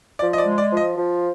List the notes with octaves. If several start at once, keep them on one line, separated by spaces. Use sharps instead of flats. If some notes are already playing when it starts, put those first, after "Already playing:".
F3 D5
D#5
D5
G#3
D5
F3
D#5
F3